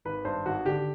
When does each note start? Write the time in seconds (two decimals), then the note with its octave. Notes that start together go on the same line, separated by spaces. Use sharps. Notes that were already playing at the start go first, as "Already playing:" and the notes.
0.05 G#1 B4
0.25 G2 C5
0.45 G#1 F#4
0.65 D3 G4